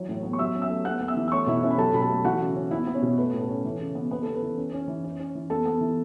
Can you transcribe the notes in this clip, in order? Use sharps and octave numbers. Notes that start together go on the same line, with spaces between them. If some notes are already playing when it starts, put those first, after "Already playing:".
Already playing: E3 F#3 C#5
A2
B3
C#6
F#3 E5 E6
C#4
E5 E6
A3
B3 F#5 F#6
B3
E5 E6
E3
E6
A3 C#5 C#6
B2 E4 E5
C#4 E4 E5
B5
F#3 A4 A5
B2 B5
A4 A5
A3
E3 F#4 F#5
C#3
C#4
B3 E4 E5
B3
C#4 C#5
B2
A3 B4
A2
A4
C#4
E3
C#3
B3
B3 B4
A4
B3
B4
E3
C#4
C#4
E3
C#4
C#4
E3
B3 A4 A5
B3
E3